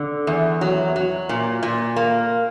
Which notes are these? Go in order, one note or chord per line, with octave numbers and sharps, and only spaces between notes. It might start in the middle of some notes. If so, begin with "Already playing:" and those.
Already playing: D3
E2
F#3
F#3
A#2
A#2
A#3